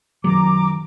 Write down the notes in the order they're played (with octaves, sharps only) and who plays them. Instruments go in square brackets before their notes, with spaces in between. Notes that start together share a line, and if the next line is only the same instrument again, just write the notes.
[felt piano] F#2 [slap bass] D#3 F#3 [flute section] A#5 D6